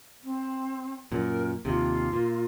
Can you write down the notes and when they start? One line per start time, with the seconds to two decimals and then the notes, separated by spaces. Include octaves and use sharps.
0.23 C4
1.12 F#2 A#2 A#4
1.65 D#2 C3 F4
2.13 A#2